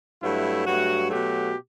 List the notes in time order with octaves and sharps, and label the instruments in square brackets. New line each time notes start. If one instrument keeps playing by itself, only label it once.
[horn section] G2 F#3 A3 E4
G2 F#3 A3 F#4
B2 F#3 A3 G4